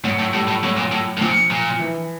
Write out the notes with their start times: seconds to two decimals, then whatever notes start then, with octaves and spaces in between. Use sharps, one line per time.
0.04 G#2 F#3
0.19 A2
0.34 A2 G3
0.48 A2
0.64 A2 F#3
0.77 A#2
0.92 A2
1.17 A2
1.21 A#2 F3
1.51 A#2
1.79 E3